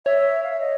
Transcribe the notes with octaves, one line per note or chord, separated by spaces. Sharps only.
C#5 E5
F5
E5
D#5